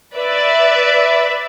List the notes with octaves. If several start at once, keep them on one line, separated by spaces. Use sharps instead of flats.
B4 D5 E5